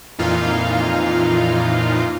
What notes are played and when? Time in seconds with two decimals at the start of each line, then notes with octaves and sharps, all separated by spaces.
0.19 F2 A#2 E3 D#4 F4 F5